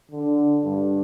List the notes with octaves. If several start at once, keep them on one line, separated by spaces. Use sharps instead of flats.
D3
G2